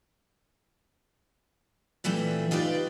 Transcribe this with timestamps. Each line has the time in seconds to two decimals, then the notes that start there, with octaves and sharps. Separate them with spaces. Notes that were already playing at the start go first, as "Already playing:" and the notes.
2.04 A#2 E3 G3 A3 C4
2.51 D#4 F4 G4 B4 D5